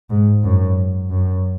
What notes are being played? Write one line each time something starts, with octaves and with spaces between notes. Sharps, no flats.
G#2
F#2
F#2